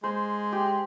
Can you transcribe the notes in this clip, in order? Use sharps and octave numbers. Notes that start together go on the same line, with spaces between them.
G#3 C5
G4